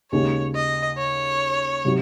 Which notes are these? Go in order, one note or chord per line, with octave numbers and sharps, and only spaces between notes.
D#2 C#3 G#3 C#4 C#5
D#5
C#5
C3 F#3